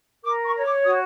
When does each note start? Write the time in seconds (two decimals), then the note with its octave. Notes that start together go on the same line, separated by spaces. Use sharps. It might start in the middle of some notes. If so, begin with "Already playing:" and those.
0.24 A#4 D6
0.44 C#6
0.55 C#5
0.64 D6
0.84 F#4 D#6